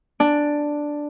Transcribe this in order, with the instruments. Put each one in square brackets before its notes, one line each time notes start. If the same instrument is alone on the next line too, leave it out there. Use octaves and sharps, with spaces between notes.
[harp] D4